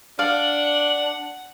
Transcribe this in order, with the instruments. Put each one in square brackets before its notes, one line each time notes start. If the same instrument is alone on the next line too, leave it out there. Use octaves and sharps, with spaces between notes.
[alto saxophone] D4 [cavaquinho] D5 F5 [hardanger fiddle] F#5 [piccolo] F#7